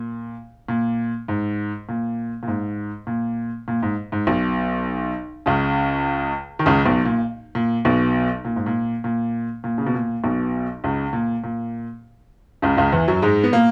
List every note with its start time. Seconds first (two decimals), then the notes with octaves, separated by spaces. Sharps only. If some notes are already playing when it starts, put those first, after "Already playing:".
Already playing: A#2
0.68 A#2
1.28 G#2
1.89 A#2
2.43 A#2
2.48 G#2
3.07 A#2
3.68 A#2
3.83 G#2
4.12 G#2
4.27 B1 B2
5.46 C#2 C#3
6.59 D#3
6.66 C#2 C#3
6.85 B1 B2
7.05 A#2
7.55 A#2
7.85 B1 B2
8.45 A#2
8.56 G#2
8.66 A#2
9.04 A#2
9.64 A#2
9.78 C#3
9.86 B2
9.94 A#2
10.24 B1 B2
10.84 C#2 C#3
11.13 A#2
11.44 A#2
12.62 C#2 C#3
12.77 C#2 C#3
12.92 E2 E3
13.08 F#2 F#3
13.22 G#2 G#3
13.44 B3
13.53 A#2 A#3